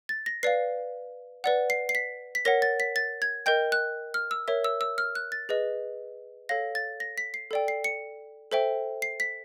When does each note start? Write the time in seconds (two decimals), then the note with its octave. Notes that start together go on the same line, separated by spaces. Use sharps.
0.09 A6
0.26 A#6
0.43 B4 D5 F5 C7
1.44 B4 D5 F#5
1.70 C7
1.89 C7
1.95 B6
2.35 B6
2.45 A#4 C#5 F#5 A#6
2.62 A6
2.80 B6
2.96 A6
3.22 G#6
3.46 A#4 D#5 G5 G6
3.72 F#6
4.14 F6
4.31 E6
4.48 A#4 C#5 E5
4.64 E6
4.81 E6
4.98 F6
5.15 F#6
5.32 A6
5.49 G#4 B4 D#5
6.49 A4 C#5 F5 A#6
6.75 A6
7.00 A#6
7.18 B6
7.34 C7
7.51 A4 D5 G5
7.68 C7
7.84 C#7
8.52 A4 C5 E5 G5
9.02 C7
9.20 B6